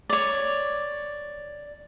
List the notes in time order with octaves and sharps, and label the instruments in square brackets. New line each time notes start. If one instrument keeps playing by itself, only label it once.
[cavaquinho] C#5 D5